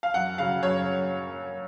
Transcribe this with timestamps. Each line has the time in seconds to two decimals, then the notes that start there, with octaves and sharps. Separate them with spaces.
0.03 F5
0.14 F#2 F#5
0.38 C#3 F#3 F5
0.63 F#2 C#5